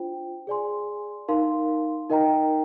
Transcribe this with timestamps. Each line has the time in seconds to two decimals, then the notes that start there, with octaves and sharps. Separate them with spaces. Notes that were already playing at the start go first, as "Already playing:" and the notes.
Already playing: D4 F4 C5 G5
0.47 G#4 D5 G#5 C6
1.28 D#4 A#4 F5 C6
2.10 D#4 A#4 D#5 G5 A#5